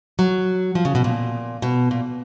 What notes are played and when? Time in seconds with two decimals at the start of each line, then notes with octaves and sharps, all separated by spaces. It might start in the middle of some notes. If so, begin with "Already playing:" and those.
0.19 F#3
0.75 F3
0.85 C#3
0.95 B2
1.04 A#2
1.62 B2
1.91 A#2